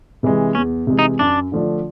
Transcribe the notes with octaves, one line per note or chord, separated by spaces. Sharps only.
C3 E3 G#3
E2 C#4
C3 E3 G#3
D#4
F#2 D4
D3 F3 A3 D4